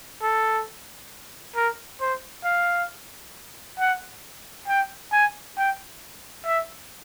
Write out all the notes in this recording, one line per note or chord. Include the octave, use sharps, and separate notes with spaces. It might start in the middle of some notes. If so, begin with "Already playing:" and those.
A4
A#4
C5
F5
F#5
G5
G#5
G5
E5